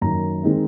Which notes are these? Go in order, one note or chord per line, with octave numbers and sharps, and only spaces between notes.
F#2 D#3 A#3 A#5
D#3 G#3 C4 D#4